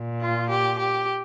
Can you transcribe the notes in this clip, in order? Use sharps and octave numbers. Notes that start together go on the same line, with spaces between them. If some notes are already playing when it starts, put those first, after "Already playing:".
Already playing: A#2
F4
G4
G4